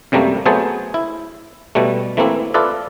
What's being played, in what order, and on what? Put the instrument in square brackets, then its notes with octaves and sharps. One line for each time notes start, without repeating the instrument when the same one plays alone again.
[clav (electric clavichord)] F#2 C3 G3 A3 A#3
F#3 A3 B3 G#4 C5 A5
E4
B2 G3 A3
E3 A3 A#3 C4 E4
F4 A4 B4 D5 E5